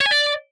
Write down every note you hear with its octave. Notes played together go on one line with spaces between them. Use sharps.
C#5
G#5
D5